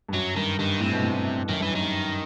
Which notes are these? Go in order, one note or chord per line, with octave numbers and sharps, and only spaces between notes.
G2
F#2 F#3
G2 D#3
G2 D#3
A2 C3
B2
A2
A2
F#2 D#3
G2 E3
F#2
D#3
G2